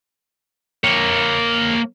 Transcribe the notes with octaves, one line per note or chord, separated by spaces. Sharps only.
A#3 C#5